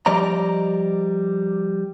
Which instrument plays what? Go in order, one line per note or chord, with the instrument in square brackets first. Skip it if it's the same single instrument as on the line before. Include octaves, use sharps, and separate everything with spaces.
[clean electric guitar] F3 G3 D5 D#5 A#5